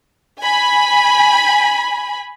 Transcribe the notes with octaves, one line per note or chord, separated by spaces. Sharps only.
G#5 B5